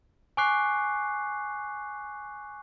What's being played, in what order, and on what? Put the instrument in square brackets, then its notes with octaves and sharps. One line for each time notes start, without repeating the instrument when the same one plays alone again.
[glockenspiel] G#5 C#6 D6 F#6 C7